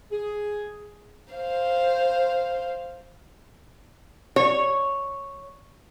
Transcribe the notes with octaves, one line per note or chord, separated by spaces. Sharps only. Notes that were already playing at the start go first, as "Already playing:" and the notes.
G#4
C5 F5
C#5